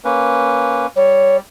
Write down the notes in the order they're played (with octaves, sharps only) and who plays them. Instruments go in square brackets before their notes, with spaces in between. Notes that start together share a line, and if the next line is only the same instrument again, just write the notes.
[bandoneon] A#3 C#4 B4
[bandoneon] G3 [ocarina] C#5